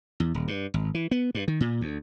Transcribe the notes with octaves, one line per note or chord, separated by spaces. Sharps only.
E2
D#1
G2
G#1
E3
B3
G2
D#3
A#2
D2